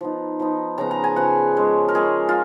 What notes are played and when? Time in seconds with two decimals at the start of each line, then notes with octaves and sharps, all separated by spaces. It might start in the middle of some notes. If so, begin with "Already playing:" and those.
0.01 F3 B3 D#4
0.39 F3 B3 D#4
0.78 C#3 F3 B3 A#5
0.91 A#5
1.04 G#5
1.16 C#3 F3 B3 F#5
1.56 F3 G#3 C#4
1.89 A#4
1.94 F3 G#3 C#4 G#4
2.29 F4